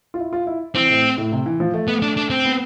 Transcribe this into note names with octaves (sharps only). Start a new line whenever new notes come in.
F4
E4
F4
E4
E3 C4
A2
A2
C3
E3
F3
A3
A3 B3
D4
D4
C4
B3